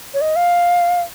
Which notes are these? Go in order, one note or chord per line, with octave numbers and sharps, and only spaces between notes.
C#5
D#5
F5